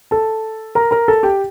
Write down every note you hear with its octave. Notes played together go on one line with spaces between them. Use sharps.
A4 A5
A#4 A#5
A#4 A#5
A4 A5
G4 G5